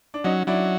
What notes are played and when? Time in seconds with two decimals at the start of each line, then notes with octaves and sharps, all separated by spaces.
0.14 D4
0.24 F#3 C#4 D#4
0.47 F#3 D4 E4